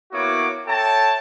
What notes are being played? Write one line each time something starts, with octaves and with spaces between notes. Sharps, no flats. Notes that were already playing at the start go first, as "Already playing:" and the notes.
A#3 B3 E4 F#4 C#5 D6
A4 C#5 E5 G5 A5